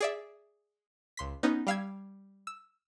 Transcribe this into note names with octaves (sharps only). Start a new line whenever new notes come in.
G#4 D5 E5
C#2 C6 B6
B3 C#4 D#4
G3 F5 E6 G#6
E6